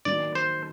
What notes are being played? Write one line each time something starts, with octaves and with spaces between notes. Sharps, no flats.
D#3 F#3 A#3 D5
C5